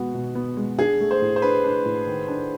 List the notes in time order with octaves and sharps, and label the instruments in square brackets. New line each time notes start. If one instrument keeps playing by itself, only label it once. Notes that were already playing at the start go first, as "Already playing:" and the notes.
Already playing: [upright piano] B2 G#3 B3 [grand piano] F#4
[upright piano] B2
B3
G#3
[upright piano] D4 [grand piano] G#4
[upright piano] A3
[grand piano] C5
[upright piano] A2
[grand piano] C5
[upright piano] D4 [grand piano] B4
[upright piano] D4
A2
D#3
D4